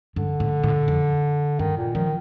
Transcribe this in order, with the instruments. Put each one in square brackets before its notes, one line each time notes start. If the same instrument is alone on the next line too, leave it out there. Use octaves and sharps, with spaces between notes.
[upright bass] G2 [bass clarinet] D3
[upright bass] A2
A2
F2
[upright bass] G2 [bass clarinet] D#3
[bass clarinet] A#2
[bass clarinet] D#3 [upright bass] F3